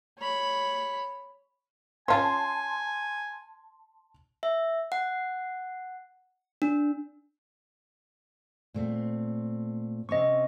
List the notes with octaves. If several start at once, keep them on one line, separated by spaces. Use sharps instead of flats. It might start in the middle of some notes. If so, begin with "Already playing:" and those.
C#5 B5
C#4 F4 G#5 A5 C6
E5
F#5
D4
A#2 A3 C4
C3 C4 C#4 D#5 C#6